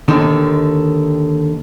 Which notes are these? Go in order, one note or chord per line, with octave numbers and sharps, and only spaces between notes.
D#2 D3 D#3